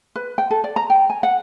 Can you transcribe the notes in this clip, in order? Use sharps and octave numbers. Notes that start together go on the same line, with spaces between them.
B4
G5
A4
D5
A#5
G5
G#5
F#5